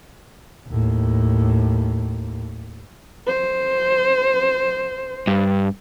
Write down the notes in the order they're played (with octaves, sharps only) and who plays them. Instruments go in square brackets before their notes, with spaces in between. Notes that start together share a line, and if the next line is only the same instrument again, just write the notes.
[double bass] D#2 A2
[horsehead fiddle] C5
[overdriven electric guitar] G2